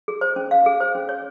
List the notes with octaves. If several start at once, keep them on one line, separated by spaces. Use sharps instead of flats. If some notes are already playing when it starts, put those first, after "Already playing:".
G#4
C5
C#4
F5
G#4
C5
C#4
C#5